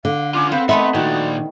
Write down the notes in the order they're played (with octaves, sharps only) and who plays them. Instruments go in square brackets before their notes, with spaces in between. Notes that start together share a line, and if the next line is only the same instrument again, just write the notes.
[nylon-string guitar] D3 [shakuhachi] F5
[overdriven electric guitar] C#4 F4 [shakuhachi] D6
[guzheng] B3 [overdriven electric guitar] C4 [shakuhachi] F5
[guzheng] A3 B3 D#4 [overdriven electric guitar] C4 B5 [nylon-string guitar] E5 [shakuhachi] C6
[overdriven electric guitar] A#2 D4 [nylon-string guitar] D#3 [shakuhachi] F#4